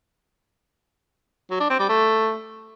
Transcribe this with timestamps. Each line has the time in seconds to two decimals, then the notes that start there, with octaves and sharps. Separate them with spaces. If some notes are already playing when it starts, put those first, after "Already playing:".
1.51 F#3
1.60 D4
1.70 C4
1.79 G3
1.89 A3